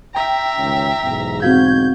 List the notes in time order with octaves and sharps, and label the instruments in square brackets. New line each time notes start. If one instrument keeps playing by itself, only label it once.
[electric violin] E5 A#5 [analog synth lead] G5
[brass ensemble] C#2 D#3 C#4
B1 E2 G#2
[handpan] C4 F#4 F5 [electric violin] G6 [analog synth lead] G#6